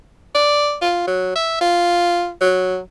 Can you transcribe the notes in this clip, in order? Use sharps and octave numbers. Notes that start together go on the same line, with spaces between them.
D5
F4
F#3
E5
F4
F#3